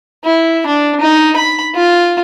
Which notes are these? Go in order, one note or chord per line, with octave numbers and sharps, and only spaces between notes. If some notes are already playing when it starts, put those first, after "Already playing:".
E4
D4
D#4
B5
F4